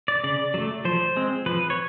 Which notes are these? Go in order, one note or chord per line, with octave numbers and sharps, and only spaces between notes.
D5
C#3 D5
F#3 A3
F3 C5
G#3 C4
F3 B4
C#5